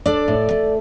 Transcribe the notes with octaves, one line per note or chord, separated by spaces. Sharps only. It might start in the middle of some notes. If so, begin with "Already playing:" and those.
D4 A4 D5
A2
A3